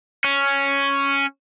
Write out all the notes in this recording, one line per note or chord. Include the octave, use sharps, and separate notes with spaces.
C#4